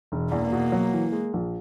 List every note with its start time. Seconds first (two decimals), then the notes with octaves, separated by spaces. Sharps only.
0.12 E1
0.32 E2 A#3
0.53 B2
0.72 F#3
0.93 E3
1.12 G#3
1.34 A#1